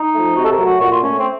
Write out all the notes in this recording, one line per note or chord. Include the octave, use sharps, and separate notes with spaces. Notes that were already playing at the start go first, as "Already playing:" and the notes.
Already playing: D#4
F3 A3
C3 F#4
A4
A#4
F#3 A3
F#4
A#2 F#4
F4
A3 C#4
C4